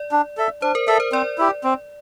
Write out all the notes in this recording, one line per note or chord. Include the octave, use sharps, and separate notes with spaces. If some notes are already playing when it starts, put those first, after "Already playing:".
Already playing: D5
D4
A4 E5
D4 C5
A#4
A4 A#4 E5
C5
C4 D5
E4 G4
C4